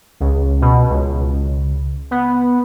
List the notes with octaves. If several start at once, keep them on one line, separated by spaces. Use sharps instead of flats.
C#2
B2
C#2
B3